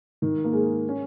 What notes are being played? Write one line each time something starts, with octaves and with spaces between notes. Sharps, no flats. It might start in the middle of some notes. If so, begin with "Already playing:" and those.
D#3
A#3
G#3
C#4